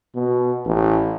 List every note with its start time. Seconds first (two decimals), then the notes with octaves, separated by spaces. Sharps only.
0.15 B2
0.65 A1